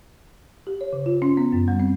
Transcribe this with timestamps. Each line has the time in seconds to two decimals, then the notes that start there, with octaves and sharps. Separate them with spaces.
0.67 G4
0.81 C#5
0.93 C#3
1.06 F4
1.22 C#4
1.37 B3
1.53 F#2
1.68 G3
1.80 C4